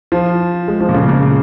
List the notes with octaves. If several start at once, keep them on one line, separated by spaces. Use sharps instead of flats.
F3
G#3
F3
A#2
C#3
A#2